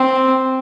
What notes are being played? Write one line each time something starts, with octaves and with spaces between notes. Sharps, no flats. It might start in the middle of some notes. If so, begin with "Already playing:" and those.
Already playing: C4